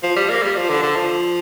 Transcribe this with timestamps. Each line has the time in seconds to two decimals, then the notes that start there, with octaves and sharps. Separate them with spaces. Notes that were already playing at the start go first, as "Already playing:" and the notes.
0.03 F3
0.16 G3
0.30 A#3
0.43 G3
0.56 F3
0.69 D3
0.83 D3
0.96 F3